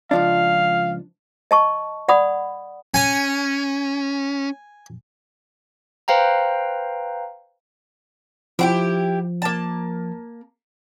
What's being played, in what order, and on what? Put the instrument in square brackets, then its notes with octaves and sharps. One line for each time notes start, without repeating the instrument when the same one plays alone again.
[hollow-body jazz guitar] C#2 F3 D4 [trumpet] F5
[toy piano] D#5 A5 C#6
D5 F#5 B5 D#6
[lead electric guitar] C#4 [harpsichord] G#5
[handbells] B4 C5 F5 G5 A#5
[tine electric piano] F3 [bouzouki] E4 F#4 G4
[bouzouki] A#3 A5